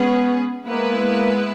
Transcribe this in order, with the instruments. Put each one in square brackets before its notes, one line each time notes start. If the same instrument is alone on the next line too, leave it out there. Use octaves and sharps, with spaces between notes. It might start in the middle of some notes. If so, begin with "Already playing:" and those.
Already playing: [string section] G#3 C#4 G#4 B4 [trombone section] B3
[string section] G#3 B3 E4 B4 [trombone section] A#3
[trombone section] A#3